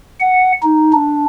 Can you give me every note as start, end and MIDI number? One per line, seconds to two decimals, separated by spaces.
0.20 0.52 78
0.63 0.93 63
0.93 1.26 62